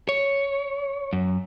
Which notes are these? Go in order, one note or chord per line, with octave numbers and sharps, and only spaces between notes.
C#5
F#2